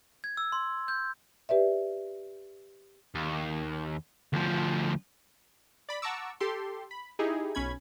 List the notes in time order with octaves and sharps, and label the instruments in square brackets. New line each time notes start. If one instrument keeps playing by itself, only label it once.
[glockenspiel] G#6
E6
C6
G6
[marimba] G4 B4 D5 E5
[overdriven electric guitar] D#2
D2 F3
[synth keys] D5 B5
F#5 A5 A#5 C#6 D6 E6
G4 A4 C6
B5
D#4 E4 G4 G#4
B1 C#4 B5 G#6